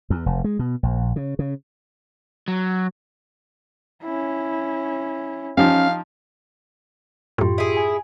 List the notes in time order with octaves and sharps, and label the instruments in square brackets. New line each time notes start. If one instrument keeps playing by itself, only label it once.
[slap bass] E2
F1
G#3
B2
A#1
C#3
C#3
[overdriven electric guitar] F#3
[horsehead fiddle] C#4 E4
[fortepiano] F3 D#4 G4 [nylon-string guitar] C#4 [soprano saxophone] F5
[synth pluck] F#2 A2 [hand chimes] F4 G4 C6
[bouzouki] E4 G#4
[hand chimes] G#5